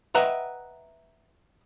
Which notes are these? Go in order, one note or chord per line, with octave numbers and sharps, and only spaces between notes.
B4 D#5 E5 F#5 G5 A#5